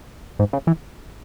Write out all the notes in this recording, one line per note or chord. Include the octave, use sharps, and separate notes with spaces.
G#2
C#3
E3